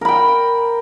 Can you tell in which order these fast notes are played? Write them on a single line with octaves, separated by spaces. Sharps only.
A#4 B5 G5